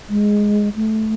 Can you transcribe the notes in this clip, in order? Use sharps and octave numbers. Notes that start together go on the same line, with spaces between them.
G#3
A3